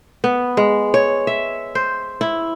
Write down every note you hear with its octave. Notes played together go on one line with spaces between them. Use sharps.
B3
G#3
C#5
E5
C5
E4